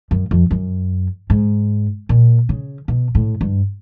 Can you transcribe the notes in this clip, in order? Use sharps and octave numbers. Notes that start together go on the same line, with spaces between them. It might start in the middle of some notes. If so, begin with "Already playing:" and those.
F#2
F2
F#2
G#2
A#2
C#3
B2
A2
G2